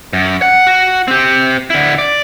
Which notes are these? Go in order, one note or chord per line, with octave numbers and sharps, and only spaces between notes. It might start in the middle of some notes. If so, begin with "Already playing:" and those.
F#2
F#5
F#4
C4 G4
D3 E4
D5